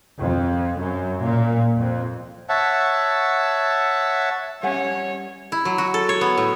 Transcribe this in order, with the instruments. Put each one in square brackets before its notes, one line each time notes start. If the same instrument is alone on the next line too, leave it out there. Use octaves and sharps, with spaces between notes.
[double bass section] F2
F#2
A#2
F2
[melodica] C#5 E5 F#5 A5
[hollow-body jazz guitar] G3 C#4 [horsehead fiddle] C#5 [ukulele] E5 F#5 G#5
[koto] E4
F#3
F#4
A4
C#5
B3
A2